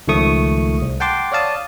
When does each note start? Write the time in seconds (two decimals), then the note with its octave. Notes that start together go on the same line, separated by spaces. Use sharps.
0.08 C#2 D#3 F3 A3 C#6 D#6
0.82 C2
1.00 F#5 G5 A5 C6 D6
1.32 C#5 D5 F5 A5 D#6